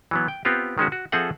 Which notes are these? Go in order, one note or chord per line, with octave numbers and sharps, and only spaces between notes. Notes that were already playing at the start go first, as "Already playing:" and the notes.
E3 F#3 B3
G5
B3 C4 F4 G4
D#3 G#3 C#4 F#4
F#4
F3 C4 G#4 A4 E5 F#5